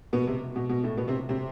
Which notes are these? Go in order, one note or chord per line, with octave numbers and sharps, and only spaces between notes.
B2 B3
C3
B2
B2
A2 A3
B2 B3
C3 C4
C3 C4